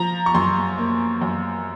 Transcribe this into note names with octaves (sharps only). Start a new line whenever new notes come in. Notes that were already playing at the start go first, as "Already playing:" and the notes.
Already playing: F3 A#5
C#6
F#2 C6
A#3
F#2